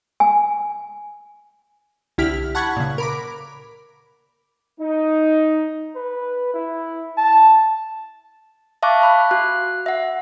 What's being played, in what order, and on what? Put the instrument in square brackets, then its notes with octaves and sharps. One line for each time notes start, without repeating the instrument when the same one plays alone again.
[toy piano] G#5
[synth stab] C2 D3 E4 G4 F6 B6
F#5 A5 B5 C#6 F#6 G#6
A#2 C#3
A#4 B5 D6
[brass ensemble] D#4
[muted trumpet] B4
E4
A5
[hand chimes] E5 F5 A5 C#6 D6 F#6
F5 B5 F#6
F#4 F#6
E5 F#5